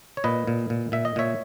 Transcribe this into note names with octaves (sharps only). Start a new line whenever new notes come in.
C#5
A#2 B4 D#5
A#2
A#2
A#2 E5
D#5
A#2 C#5 E5